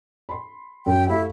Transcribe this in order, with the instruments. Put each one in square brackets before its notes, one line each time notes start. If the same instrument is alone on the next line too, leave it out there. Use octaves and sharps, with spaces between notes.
[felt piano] B5 C6
[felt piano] F#2 [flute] G5
[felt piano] A3 G4 F5 [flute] E4